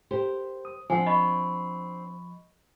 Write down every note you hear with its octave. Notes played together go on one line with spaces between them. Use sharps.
G4 A#4 C5
D#6
F3 C4 D4 F#5 G#5
D#5 B5 C#6